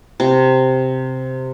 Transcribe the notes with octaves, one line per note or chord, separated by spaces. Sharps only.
C3